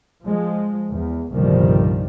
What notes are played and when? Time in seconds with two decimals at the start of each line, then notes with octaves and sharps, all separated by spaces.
0.24 F3 G#3
0.90 E2
1.32 G1 C2 A#2 D#3 F3 G3